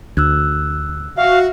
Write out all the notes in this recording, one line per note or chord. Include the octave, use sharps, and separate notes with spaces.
D2 E6 F#6 G#6
F#4 E5 F5